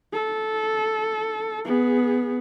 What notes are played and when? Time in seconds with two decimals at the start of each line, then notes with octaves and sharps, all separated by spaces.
0.13 A4
1.65 B3 G#4